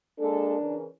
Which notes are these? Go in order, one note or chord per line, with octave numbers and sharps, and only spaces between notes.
G#3 A#3 D4 A4
C#3 E3 A#4